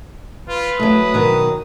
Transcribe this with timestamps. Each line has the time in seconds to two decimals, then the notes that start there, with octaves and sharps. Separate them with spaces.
0.48 F4 B4
0.79 F#3 A3 D#6
1.14 B2 D#3 F#3